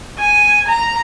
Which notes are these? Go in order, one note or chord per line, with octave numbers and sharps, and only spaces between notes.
G#5
A#5